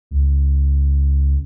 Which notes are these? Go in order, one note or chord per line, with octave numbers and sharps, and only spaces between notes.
C#2